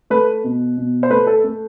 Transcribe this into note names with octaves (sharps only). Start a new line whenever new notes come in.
A3 B4
B2
B2
C5
A3 B4
A4
A3